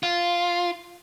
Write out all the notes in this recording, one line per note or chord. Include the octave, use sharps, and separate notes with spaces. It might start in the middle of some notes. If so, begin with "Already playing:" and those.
F4